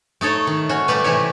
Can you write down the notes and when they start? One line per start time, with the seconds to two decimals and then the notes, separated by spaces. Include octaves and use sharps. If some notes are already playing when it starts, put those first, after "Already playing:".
0.21 A3 D#4 A4 C#5
0.47 D#3
0.69 C#4 F#4
0.88 G3 A3 G4 B4
1.04 C3 E3 E4 C#5